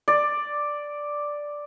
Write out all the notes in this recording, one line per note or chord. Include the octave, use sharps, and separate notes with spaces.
D5